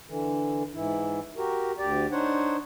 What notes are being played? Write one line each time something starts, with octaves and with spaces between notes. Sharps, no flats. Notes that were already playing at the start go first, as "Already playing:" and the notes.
D3 E3
G#2 E3 E4
F#4 G4 A#4
D2 G4 D5
D4 D#4 C5 C#5 F#5